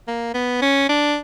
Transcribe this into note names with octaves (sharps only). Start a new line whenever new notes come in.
A#3
B3
C#4
D4